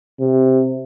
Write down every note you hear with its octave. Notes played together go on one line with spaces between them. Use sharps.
C3